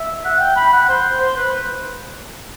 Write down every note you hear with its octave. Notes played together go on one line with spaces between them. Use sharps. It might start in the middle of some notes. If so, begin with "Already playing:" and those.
Already playing: E5
F#5
G5
B5
F#5
C5
C5
B4